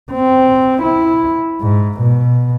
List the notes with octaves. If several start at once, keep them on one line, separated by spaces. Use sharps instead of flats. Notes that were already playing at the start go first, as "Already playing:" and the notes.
C4
E4
G#2
B2